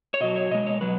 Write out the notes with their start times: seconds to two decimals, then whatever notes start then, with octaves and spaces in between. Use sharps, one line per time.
0.14 C#5
0.21 B2 F#3 D#5
0.35 C#5
0.51 B2 G#3 D#5
0.67 C#5
0.81 B2 F#3 B4